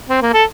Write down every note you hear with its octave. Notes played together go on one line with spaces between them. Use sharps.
C4
A#3
A4